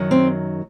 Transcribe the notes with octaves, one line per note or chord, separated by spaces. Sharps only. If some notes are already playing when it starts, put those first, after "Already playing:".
Already playing: F#2 D#3 F#3
C4